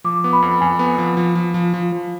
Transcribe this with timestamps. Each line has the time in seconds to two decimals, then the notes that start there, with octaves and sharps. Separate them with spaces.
0.04 F3 D6
0.24 B3
0.33 B5
0.42 F2
0.61 F2 G#5
0.79 B3
0.98 F3
1.17 F3
1.35 F3
1.54 F3
1.74 F3
1.92 F3